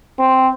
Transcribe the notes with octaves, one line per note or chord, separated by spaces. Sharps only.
C4